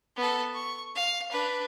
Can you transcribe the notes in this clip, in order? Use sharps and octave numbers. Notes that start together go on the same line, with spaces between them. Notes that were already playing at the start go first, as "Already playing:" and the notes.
B3 A4
C#6
F5
D4 B4